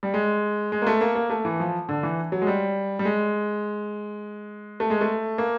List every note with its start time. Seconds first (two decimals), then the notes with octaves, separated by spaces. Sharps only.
0.03 G3
0.14 G#3
0.72 G#3
0.82 A#3
0.87 A3
1.01 A#3
1.15 A#3
1.30 A3
1.45 E3
1.60 F3
1.89 D3
2.03 E3
2.32 F#3
2.42 G#3
2.47 G3
2.99 G3
3.05 G#3
4.80 A3
4.90 G#3
5.01 A3
5.38 A#3